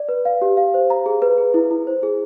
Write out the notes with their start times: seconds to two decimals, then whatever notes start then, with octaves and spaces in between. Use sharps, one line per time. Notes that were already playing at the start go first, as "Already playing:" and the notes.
Already playing: D5
0.09 B4
0.25 F5
0.42 G4
0.57 F5
0.74 C5
0.90 A#5
1.06 G#4
1.22 B4
1.38 G#4
1.54 E4
1.71 E4
1.87 C5
2.03 G#4